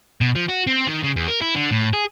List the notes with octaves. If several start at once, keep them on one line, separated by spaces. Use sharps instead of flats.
B2
F3
F#4
C4
D#3
C#3
E2
A#4
E4
D3
A2
G#4